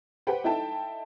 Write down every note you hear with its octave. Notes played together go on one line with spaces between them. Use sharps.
G4 B4 C5 F#5 G5
D#4 E4 A4 G5 A5